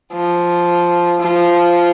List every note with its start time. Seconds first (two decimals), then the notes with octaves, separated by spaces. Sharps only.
0.12 F3
1.21 F3